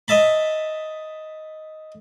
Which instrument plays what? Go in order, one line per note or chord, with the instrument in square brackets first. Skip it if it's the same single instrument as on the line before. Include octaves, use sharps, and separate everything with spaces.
[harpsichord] D#5 E5 A5 B5